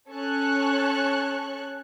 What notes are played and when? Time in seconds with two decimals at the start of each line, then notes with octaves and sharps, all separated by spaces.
0.12 C#4 A4 C#5 A5 C#6 F#6